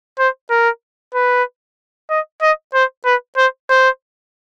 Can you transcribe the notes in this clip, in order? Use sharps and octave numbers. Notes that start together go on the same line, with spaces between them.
C5
A#4
B4
D#5
D#5
C5
B4
C5
C5